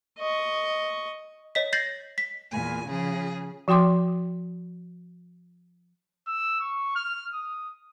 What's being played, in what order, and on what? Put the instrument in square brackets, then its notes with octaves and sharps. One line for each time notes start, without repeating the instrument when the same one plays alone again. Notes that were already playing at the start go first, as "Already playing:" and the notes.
[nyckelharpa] D#5 C#6
[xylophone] C#5 D#5 B6
G6 A6 A#6 C7 F#7
B6
[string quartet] E2 A#2 G#5
C#3 F3 G#4
[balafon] F3 F#4 G5 C6 D6
[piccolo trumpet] E6
C#6
F6
D#6